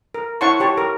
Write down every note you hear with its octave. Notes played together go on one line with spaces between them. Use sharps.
A#4
E4 C#5 F#5 A5 C6 C#6
G4 C#5 A5
A#4